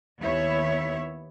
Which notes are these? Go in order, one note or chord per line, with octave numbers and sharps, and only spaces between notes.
D#2 B3 E4 C#5 E5